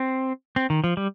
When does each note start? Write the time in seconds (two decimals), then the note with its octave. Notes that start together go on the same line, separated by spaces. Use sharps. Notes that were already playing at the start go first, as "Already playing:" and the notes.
Already playing: C4
0.56 C4
0.70 D#3
0.84 F3
0.97 G3